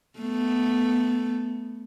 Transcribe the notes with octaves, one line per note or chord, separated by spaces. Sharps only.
A3 B3